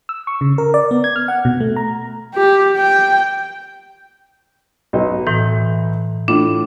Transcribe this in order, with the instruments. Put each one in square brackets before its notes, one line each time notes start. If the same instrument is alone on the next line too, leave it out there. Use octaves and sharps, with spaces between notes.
[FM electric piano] E6
C#6
C#3
A#4
D5
B3
G#6
F6
F#5
B2
A3
A#5
[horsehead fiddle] G4
G5
[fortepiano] B1 B4 D#5
[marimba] A2 E3
[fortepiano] A2 F4 [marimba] D4